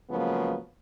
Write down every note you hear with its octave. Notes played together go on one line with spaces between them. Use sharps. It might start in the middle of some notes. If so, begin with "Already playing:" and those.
C#3 F3 F#3 G#3 A#3 B3